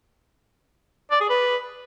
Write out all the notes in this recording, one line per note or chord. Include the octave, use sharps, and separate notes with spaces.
D5
G#4
B4